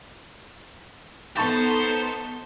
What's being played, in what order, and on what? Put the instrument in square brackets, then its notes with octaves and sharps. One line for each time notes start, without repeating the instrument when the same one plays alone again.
[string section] B3 D#4 A4 [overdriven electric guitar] C5 [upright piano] A5 C#6 A6